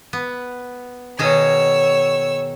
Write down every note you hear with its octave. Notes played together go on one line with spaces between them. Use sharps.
B3
B2 D#3 G#4 C#5 E6